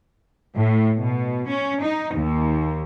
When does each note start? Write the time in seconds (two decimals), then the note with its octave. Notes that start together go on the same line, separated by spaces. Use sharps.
0.56 A2
0.99 B2
1.48 C#4
1.82 D#4
2.15 D#2